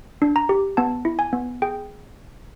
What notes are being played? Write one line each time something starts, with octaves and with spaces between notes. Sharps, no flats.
D4
A#5
G4
B3 A5
E4
G#5
B3
G#4 G5